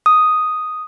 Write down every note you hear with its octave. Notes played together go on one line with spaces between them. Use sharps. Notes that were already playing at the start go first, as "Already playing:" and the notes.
D#6